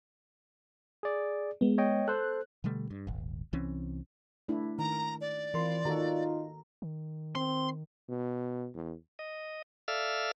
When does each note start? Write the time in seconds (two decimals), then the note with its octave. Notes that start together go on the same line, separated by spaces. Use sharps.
1.03 G#4 D5
1.61 G#3 B3
1.78 C#5 D#5 G5
2.08 A4 C5 F#6
2.64 B2 D3 G3 A3
2.91 G2
3.07 D#1 G#1
3.53 C2 E3 C4 C#4
4.48 A3 D4 E4
4.78 D#3 A#5
5.21 D5
5.54 C3 E3 F4 A#4 C6
5.85 D#3 D#4 F4 F#4 A4 A#5
6.82 D#3
7.35 C4 C6
8.09 B2
8.75 E2
9.19 D#5
9.88 A4 D5 E5 F5 E6 F6